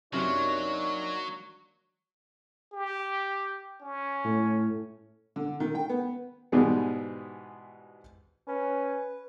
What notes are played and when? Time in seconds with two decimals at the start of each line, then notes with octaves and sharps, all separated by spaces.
0.13 F#2 C3 F#3 A#3 D4 D#4 C#5
2.73 G4
3.81 C#4
4.24 A2
5.36 D3
5.60 D#3
5.75 G5
5.89 B3
6.52 G#2 B2 E3 G3 G#3 B3
8.47 C#4 B4